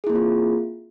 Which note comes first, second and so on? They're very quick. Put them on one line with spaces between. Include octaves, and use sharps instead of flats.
G#4 E4 A#3 C4 F4